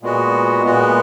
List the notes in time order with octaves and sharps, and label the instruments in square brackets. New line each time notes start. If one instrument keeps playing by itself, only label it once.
[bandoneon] A#2 G#3 B3 F#4
A#2 G#3 B3 F#4